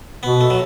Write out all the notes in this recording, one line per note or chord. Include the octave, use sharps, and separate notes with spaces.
B2 B3
A3
F#3